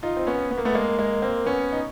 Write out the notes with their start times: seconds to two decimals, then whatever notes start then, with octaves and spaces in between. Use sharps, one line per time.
0.03 D#4 F4
0.17 C4
0.27 B3 C#4
0.51 B3
0.57 A#3
0.65 A3 B3
0.75 G#3 A#3
0.99 G#3 A#3
1.22 A#3 C4
1.46 B3 C#4
1.72 D#4